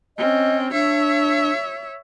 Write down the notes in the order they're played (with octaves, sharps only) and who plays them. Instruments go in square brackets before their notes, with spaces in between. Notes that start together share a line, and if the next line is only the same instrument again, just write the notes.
[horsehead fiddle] C4 C#4 [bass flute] D#5
[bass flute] D4 [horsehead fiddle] C#5 E5